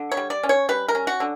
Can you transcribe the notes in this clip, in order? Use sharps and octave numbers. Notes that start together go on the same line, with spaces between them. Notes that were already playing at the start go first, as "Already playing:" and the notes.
Already playing: D3
C#5
G3
D5
C#4
C#5
G3 B4
A#4
C#4
F#4
D3